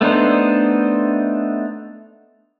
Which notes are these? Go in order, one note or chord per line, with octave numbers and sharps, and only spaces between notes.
A3 B3 D4 D#4 C5